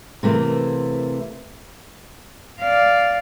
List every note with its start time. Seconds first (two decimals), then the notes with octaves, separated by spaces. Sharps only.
0.23 C3 E3 A3 A#3
2.60 D5 F5